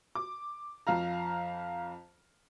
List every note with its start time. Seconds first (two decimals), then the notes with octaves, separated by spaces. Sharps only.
0.15 D6
0.87 F2 F4 F5 A#5